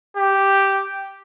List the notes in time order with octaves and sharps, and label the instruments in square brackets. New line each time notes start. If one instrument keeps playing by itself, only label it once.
[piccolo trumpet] G4